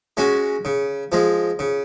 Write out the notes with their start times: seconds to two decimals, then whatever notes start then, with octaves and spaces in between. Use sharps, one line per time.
0.17 G#3 C#4 F#4
0.65 C#3
1.12 F3 G#3
1.59 C#3